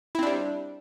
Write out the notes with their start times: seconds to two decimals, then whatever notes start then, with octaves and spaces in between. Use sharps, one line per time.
0.15 E4
0.19 C4
0.23 D4
0.27 G3